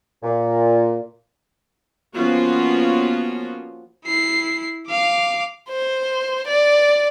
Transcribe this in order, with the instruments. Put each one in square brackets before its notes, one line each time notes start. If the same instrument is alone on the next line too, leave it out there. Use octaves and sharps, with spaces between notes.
[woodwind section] A#2
[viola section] F3 A#3 B3 C#4 F4 F#4
[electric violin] E4 C7
F5 D6
[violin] C5
D5